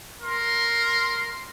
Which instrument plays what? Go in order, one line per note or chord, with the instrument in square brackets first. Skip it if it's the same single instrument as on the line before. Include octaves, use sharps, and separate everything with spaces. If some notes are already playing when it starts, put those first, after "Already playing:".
[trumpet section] A#4 C6